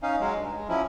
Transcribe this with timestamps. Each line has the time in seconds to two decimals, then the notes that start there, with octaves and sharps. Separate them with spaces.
0.03 C#4 D#4 F5
0.20 F#3 G#3
0.36 G2
0.55 G#3
0.68 F3 F#3 C#4 E4